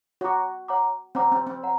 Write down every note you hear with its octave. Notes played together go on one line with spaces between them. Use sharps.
F#4 C#5 F#5 A#5 D6
C#5 F#5 A#5 D6
C4 C#5 F#5 A#5 D6
C4
C4
C#5 F#5 A#5